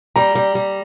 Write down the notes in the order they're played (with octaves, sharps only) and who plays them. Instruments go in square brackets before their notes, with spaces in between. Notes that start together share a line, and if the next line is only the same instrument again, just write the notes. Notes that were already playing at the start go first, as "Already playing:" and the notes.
[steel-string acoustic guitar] G3 [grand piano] A#5
[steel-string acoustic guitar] G3
G3